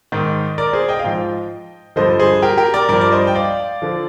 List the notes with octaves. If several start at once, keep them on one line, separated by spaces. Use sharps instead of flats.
G#2 D#3
A#4 D5
G#4 C5
D#5 G5
F5
G#2 F3 D#5 G5
G2 D3 F3 C5 D#5
G#4 C5
G4 A#4
G4 A#4
A#4 D5
G2 F3 A#4 D5
D5
C5 D#5
G5
D5 F5
D3 F3